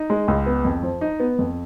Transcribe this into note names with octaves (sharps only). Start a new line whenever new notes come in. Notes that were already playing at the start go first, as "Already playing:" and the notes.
Already playing: D#4
G#3
C#2
B3
F2
F3
D#4
B3
F2